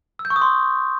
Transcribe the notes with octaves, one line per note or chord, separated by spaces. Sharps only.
E6
G6
C#6
D#6
C6